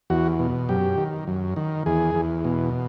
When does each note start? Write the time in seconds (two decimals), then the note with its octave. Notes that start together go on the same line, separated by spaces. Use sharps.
0.10 E2 F#4
0.39 B2
0.69 F#2 G4
0.97 D#3
1.27 F#2
1.56 D#3
1.86 E2 G#4
2.15 E2
2.44 B2